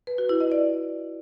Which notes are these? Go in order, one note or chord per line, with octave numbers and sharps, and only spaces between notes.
B4
F#4
E4
D#5
D5